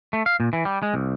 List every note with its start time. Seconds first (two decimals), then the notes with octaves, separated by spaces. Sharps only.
0.13 A3
0.26 F5
0.40 A#2
0.53 E3
0.65 G3
0.83 G#3
0.94 C2